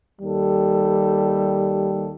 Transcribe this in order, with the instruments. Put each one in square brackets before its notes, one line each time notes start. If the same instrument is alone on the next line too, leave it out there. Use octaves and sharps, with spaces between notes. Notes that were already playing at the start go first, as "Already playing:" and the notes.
[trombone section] D#2 G3 A4